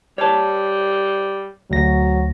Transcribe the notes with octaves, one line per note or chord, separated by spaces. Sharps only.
G3 C#5 A5
D2 F#3 A#6